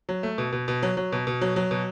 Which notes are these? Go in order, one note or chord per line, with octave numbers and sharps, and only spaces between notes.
F#3
A3
B2
B2
B2
F#3
F#3
B2
B2
F#3
F#3
B2